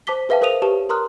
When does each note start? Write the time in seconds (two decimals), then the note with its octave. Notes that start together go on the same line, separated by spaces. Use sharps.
0.07 C5 A5 D6 B6 G7
0.29 G#4 B4 E5 F5 G5 A5
0.41 A#4 C5 F5 D#6 D#7 F7
0.62 G4 B4 C#5 A5 E7
0.89 A#4 A#5 C6 D#6 F6 F#6